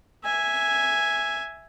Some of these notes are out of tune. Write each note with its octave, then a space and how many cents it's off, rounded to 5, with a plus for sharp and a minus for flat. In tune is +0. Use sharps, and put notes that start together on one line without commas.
E5 +0 G#5 +0